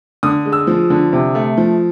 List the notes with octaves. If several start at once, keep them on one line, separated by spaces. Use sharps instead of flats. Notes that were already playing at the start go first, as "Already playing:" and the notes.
D3 D#6
G#3
E6
F3
D3
C3
A3
F3